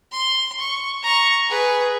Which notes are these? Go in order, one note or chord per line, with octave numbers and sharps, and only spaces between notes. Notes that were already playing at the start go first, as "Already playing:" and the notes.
C6
C#6
A#5 C#6
G#4 B4